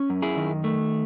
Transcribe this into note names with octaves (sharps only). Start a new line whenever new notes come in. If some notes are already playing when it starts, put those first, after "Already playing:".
Already playing: C#4
F#2
E4 G#4
D#3
A3